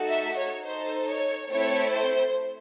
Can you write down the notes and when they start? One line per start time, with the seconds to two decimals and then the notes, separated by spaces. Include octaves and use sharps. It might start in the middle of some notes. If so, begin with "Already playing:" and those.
Already playing: A3 D#4 F#4 A4
0.08 E5
0.36 C#5
0.64 D#4 A4 C5
1.07 C#5
1.50 A3 C4 E4 A4 C#5
1.92 C5